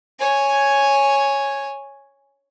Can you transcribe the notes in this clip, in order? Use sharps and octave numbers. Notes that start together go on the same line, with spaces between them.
C#5 G#5